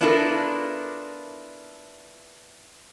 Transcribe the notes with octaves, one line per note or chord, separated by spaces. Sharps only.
B3 D4 E4 F4 A4 A#4